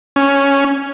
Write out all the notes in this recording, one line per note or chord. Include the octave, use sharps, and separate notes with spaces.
C#4